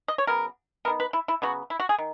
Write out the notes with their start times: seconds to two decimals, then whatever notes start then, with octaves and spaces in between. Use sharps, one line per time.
0.08 D#5
0.18 C#5
0.27 C#3 F#3 B3 A#4
0.85 D#3 G#3 B3 A#4
1.00 B4
1.13 E4
1.28 E4
1.42 C#3 F#3 B3 F#4
1.70 E4
1.80 F#4
1.89 G#4
1.98 D#3